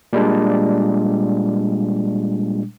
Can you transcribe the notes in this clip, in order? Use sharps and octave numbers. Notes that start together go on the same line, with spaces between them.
A#2 G3 G#3 D4